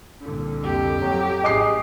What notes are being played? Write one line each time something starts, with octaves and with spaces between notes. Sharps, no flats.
C2 A#2 D3
F2 G4
F2 A2 F#3 A3
A1 F#2 G#4 D#5 D6 C7